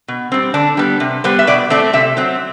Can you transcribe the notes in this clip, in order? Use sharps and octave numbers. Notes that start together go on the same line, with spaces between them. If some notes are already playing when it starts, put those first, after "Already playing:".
B2
G3 C4
D3 D4
G3 B3
C3
G3 B3 C5
E5
B2 D5
A3 C4 D5
C3 E5
F#3 C4